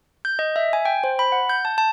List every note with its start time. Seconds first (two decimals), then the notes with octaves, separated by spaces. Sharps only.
0.25 G6
0.39 D#5
0.56 E5
0.73 G#5
0.85 G5
1.04 C5
1.19 B5
1.32 F#5
1.49 G6
1.65 A5
1.78 A5